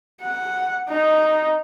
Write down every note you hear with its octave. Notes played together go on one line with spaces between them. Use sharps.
F#5
D#4